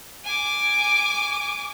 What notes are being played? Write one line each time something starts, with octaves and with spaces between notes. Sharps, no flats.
G#5 D6